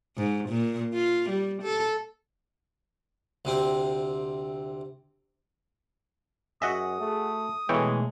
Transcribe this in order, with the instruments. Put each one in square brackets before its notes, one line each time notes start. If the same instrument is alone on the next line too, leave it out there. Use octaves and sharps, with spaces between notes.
[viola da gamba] G#2
A#2
F4
G3
A4
[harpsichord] D2 C3 C4
[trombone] F#2 [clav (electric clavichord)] F#4 D#5 E5 [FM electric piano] G#4 F#5 [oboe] D#6
[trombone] A3
[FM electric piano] B2 A3 [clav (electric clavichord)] E3 C#5 G5 [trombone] G#3